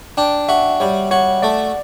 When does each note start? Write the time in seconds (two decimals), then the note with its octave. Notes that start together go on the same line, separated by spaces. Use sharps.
0.17 D4 G5
0.49 F#4 E5
0.80 G3 C#5
1.11 F#4 C#5
1.42 A3 D5